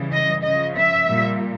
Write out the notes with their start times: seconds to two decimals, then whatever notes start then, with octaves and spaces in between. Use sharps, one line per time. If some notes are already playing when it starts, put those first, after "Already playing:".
Already playing: C#3 E3 G3
0.12 D#5
0.43 C#3 F3 D#5
0.76 E5
1.07 A#2 G3